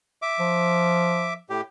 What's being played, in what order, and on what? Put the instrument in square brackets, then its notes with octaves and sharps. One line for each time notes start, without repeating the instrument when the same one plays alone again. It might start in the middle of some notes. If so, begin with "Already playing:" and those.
[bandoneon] E5 D6
[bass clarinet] F3
[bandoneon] A2 G4